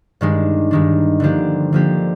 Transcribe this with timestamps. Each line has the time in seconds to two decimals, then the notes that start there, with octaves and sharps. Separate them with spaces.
0.21 G2 D#3 G#3 D4
0.71 G2 D#3 G#3 D4
1.20 D3 F3 A#3 D4 G4
1.73 D3 F3 A#3 D4 G4